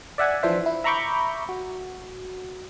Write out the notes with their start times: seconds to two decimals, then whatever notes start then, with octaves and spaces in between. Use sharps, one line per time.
0.18 D5 E5 F#5 G#5
0.43 E3 F3 D4 C5 E5
0.66 E4
0.84 E5 A#5 B5 C#6 D6 G6
1.49 F#4